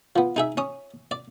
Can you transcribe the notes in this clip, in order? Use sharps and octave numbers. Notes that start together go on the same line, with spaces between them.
F3 B3
D#4 G#4 E5
C#4 D#6
D5